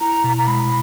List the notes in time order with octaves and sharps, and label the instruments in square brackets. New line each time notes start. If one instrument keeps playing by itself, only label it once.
[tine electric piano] E4 [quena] A#5
[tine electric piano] B2
[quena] A#5
[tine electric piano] G#3 [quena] B5